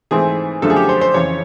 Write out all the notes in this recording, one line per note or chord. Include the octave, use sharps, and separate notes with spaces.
G#2 E3 A3 C4 G#4
F#2 D3 F3 A3 A4
G#4
G4
C5
C5
F2 C#3 E3 C#5